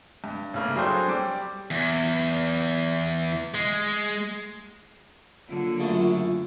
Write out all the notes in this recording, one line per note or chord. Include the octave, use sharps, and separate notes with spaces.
G2
A2 C#3 A#3
F#3 G3 D4 G#4 A4 C5
G3 D6
E2
G#3
D3 F#3 A#3 F4
F#2 A2 C#3